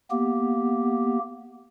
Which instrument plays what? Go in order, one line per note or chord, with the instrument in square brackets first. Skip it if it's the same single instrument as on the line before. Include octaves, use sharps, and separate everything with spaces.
[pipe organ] A#3 B3 G4